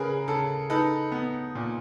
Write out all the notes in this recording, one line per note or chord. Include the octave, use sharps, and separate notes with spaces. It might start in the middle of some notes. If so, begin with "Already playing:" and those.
Already playing: C#3 G#4 A#4 B4
C#3 A4
D#4 A4 B4
B3
A#2